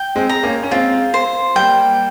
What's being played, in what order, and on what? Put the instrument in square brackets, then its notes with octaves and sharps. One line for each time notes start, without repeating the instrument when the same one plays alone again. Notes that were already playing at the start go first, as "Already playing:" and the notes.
Already playing: [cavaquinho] G5
[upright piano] G#3 C4
[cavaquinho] A#5
[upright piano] A#3 C#4
C#4
[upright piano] G#3 C4 [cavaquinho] F4
[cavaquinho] C5
[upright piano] G3 A#3 [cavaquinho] G5